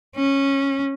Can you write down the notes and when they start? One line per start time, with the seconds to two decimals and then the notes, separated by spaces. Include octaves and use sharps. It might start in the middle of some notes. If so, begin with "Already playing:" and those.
0.16 C#4